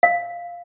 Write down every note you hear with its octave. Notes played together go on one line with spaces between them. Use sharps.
F5